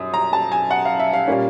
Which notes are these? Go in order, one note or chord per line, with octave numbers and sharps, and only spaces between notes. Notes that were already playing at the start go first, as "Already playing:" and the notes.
Already playing: F#2 D#6
A#5
A5
G#5
F#5
F5
E5
F5
A#2 G3 A#3 C#4